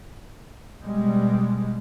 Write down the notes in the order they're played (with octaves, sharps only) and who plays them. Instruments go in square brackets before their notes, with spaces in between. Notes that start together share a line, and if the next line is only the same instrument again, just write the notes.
[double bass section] B2 G3 G#3